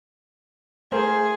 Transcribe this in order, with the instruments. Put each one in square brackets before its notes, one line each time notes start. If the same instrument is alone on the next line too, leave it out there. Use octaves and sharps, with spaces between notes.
[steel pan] A3 A#4 C5 [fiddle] G#4